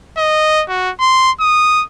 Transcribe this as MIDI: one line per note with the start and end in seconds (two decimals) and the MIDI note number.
0.18 0.64 75
0.69 0.91 66
1.00 1.31 84
1.40 1.84 87